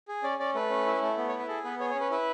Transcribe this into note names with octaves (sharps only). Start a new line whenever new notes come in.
G#4
C#4 D5
C#4 D5
A3 B4
C#4
E4
A3
B3
C#5
E4
B4
G#4 A4
B3 B4
G#4 C#5
C#5
C#4
B4
E4 B4